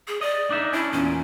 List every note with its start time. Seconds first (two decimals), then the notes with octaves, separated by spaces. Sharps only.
0.08 G#4
0.21 D5 D#5
0.50 D4 D#4 E5
0.73 C#4 D4 E4
0.92 E2 A#2 C#4